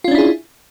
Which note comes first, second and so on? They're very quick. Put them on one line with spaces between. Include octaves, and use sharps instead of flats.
F4 C#4 D4 E4 G#4